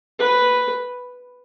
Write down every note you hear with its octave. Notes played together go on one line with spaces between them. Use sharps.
B4